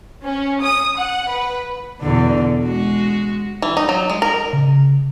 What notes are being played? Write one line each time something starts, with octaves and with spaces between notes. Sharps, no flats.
C#4
D#6
F#5
B4
E2 B2 D3
G#3 F#4
E3
D#4
F#3
G#3
A#4
C#3